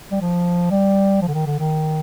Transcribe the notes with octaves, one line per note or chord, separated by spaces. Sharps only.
G3
F3
G3
F3
D3
D#3
D3
D#3